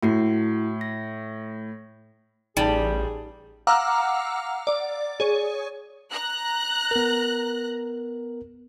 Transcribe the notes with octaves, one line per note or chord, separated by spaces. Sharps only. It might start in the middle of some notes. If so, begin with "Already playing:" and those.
A2 E4 F#4 C7
A#6
A1 G3 D#4 G#4 A5
F5 F#5 A#5 D6 E6 F6
D5
G#4 C#5
A#5 F#6
B3 A#4